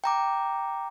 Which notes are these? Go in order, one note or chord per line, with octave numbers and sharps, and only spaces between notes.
G5 A#5 D6